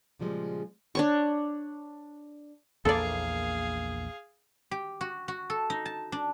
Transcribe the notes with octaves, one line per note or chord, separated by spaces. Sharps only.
A#2 C#3 F3 G3 G#3
D4 C#5 C#6
A#1 E2 A#3 G#4 A4 D5 F5
G4
F#4
F#4
A4
D#4
A5
D4